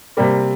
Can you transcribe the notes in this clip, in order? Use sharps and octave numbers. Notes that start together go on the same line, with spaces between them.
C3 G3 A#3